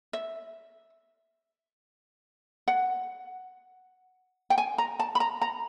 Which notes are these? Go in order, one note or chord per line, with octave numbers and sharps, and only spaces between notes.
E5
F#5
G5
G#5
A#5
A5
B5
A#5
A#5